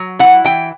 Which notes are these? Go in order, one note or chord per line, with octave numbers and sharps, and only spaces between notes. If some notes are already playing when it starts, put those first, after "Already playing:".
Already playing: F#3
E4 F#5
E3 G5